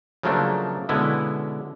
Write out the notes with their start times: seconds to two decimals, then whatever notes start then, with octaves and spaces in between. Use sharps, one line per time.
0.23 C#3 F3 F#3 A3 A#3 D4
0.89 B2 D3 G#3 B3 C#4 E4